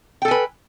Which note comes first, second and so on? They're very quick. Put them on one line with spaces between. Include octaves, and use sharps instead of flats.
G5 A4 G#5 B4